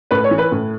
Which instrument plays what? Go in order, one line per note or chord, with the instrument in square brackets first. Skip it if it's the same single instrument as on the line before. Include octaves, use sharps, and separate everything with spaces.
[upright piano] A2 B4
C#5
E3
B4
A2